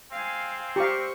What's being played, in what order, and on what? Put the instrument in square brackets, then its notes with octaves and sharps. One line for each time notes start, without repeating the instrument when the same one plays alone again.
[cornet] C4 [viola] F5 G#5
[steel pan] G4 F5 [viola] C5 C#6